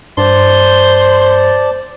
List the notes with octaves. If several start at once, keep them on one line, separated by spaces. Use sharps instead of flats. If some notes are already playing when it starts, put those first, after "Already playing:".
G2 C5 D5 A5 C6